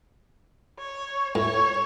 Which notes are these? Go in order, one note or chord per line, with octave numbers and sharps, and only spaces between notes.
C#5
A2 C#5